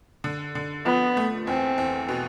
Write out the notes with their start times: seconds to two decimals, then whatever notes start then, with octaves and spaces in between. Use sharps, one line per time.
0.24 D3
0.55 D3
0.85 F3 B3
1.17 A3
1.47 E2 C4
1.78 E2
2.09 B2